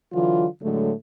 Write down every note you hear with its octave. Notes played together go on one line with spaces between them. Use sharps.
D3 E3 F#3 F4
A2 D3 F#3 G#3 A3